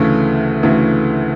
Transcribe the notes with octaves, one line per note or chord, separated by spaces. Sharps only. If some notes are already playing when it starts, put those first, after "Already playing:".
Already playing: D2 C#3 E3 A3
D2 C#3 E3 A3